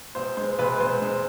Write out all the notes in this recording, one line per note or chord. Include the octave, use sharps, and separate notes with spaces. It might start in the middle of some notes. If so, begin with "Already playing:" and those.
E1 C5
G#3 C5
E1 B4
E1 C5
G#3